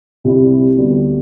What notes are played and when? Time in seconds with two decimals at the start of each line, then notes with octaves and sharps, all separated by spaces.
0.24 C2 C3 G3 C4 E4
0.77 D2 D3 G3 B3